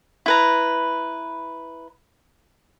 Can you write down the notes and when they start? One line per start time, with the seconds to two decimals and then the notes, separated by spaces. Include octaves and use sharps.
0.26 E4 B4 A#5